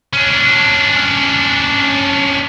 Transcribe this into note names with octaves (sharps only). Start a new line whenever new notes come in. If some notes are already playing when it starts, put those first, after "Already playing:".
C#4 D4